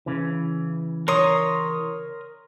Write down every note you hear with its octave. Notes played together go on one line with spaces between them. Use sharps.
C#3 E3
A#4 C#5 C6 D#6